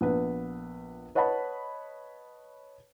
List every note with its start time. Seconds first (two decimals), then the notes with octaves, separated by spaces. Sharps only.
0.01 A#1 B3 B4
1.15 B4 C#5 D#5 F#5 A5 B5